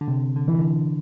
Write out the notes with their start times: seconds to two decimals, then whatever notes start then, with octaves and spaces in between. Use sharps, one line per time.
0.01 D3
0.08 C3
0.36 D3
0.48 E3
0.59 D3